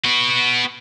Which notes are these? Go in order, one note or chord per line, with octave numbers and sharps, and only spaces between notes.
B3 F#4